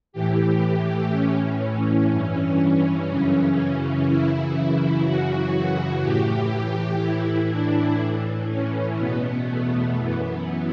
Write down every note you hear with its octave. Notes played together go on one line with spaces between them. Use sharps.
A2 E3 G4
A2 E3 C#4
G2 E3 C#4
F#2 C#3 E3 C#4
F#2 C#3 E3 E4
F#2 C#3 E3 F#4
A2 E3 G4
A2 E3 E4
D4
A2 E3
C#4
E2 B2 B3
A3
F#2 E3 B3